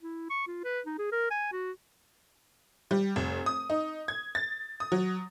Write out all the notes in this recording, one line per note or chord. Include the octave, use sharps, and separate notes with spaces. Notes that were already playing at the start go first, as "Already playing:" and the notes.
E4
C#6
F4
B4
D#4
G#4
A#4
G#5
F#4
G3
F1
D#6
D#4
G#6
A6
D#6
F#3